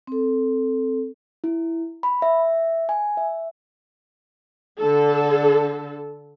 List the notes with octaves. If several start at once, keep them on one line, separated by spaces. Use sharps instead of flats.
C4 A4
E4
B5
E5
G#5
E5
D3 A4